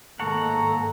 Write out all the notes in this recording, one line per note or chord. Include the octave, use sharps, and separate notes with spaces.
G#2 D#3 A#3 A4 F#5 A#5 C#6